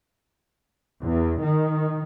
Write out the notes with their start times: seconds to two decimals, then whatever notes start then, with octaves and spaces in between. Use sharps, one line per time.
1.00 E2
1.41 D#3